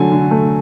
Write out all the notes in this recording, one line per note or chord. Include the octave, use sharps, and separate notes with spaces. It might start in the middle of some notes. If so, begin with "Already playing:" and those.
Already playing: D3 F#3 A3 G#5
D3
A3